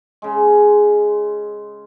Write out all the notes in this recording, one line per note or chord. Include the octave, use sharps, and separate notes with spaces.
C#3 G#3